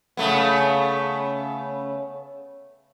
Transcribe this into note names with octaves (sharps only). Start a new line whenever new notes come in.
C#3 A3 B3